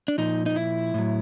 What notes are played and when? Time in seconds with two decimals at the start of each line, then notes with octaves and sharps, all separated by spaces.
0.08 D4
0.18 A#2 F3 D#4
0.46 D#4
0.56 E4
0.94 A2 F#3